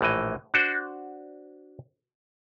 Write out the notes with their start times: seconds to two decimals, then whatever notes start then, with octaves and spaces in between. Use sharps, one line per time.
0.01 A#1 A2 E3 D#5
0.54 D4 F#4 C5